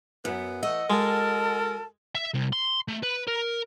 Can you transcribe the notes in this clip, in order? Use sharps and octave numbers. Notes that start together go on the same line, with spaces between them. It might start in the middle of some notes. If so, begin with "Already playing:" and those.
F#2 F#3 B3
E3 A3 D#5 F#5 E6
G#3 F#4 A4 A#4 A5
E5
C2
C6
A3
B4
A#4